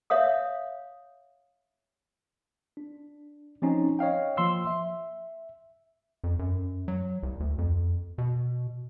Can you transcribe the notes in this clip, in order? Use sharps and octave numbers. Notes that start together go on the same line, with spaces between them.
C#5 E5 F5 D#6
D4
F3 C4 C#4 D#4
C#5 D#5 F5 G5
F3 A#3 C6 E6
E5
F2
F#2
F#3
C2
D2
F2
B2